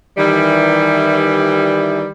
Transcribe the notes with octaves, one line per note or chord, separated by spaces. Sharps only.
D#3 E3 G3